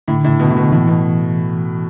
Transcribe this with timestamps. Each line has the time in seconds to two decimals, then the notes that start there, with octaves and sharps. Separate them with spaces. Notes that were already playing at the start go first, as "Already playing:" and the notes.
0.08 A2 D3
0.24 A2
0.29 D3
0.40 B2
0.50 A2 D3
0.57 B2
0.72 A2 E3
0.87 B2